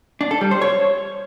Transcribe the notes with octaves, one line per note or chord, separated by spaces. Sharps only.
D4
A4
G3
C5
C#5